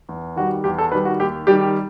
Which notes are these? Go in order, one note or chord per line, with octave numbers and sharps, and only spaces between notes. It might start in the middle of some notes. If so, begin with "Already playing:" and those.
E2
D#3 G3 F#4
E2 G4
A4
D#3 G3 B4
F#4
D#2 G4
D#3 G3 G4
G4